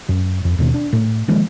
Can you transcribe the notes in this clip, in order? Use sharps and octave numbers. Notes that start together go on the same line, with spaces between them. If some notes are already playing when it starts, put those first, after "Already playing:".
F#2
F2
D#2 B2 D#3 B3
D4
A2
D#3 F3 G#3 A#3